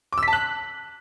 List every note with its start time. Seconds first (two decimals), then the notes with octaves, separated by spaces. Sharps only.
0.13 D6
0.18 E6
0.23 B6
0.28 A5
0.33 F#6